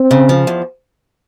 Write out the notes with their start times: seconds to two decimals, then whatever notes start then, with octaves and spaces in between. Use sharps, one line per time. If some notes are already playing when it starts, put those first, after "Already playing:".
Already playing: C4
0.11 C#3
0.29 F3
0.47 E2